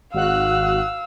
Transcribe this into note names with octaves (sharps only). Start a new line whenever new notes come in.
G#1 F#4 F5 E6 F#6